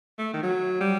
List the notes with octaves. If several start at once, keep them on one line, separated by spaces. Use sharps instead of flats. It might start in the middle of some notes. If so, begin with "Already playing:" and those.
A3
D#3
F#3
G3